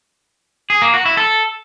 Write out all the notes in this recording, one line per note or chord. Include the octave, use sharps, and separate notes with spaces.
G#4
A#3
F#4
E4
A4